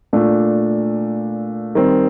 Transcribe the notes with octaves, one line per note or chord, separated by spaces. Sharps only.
A#2 A3 D4
D#3 G3 C4